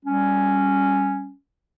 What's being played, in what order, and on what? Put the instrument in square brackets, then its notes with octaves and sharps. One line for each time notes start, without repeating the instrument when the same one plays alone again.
[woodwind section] G3 C#4